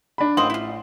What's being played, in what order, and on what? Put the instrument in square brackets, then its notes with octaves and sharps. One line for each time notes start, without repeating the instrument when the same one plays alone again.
[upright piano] D4 B5
[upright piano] A1 [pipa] A#3 C4 D#5 [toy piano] C6
[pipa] E4 F4